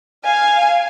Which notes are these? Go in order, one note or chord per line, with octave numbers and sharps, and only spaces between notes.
F5 G#5